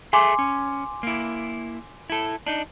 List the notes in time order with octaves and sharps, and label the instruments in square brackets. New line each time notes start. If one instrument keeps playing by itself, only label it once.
[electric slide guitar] G#4 A4 E5 [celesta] G#5 C6 D6
[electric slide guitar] C#4
A#3 E4
E4 A4
D4 D#4